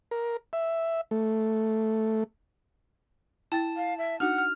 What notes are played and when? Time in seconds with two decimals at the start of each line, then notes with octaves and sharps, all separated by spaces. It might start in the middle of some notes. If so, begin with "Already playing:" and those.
0.11 A#4
0.53 E5
1.11 A3
3.52 E4 G5 A5 A6
3.77 F5
3.98 E5
4.20 D4 D#4 F#4 F#5 F6
4.38 F6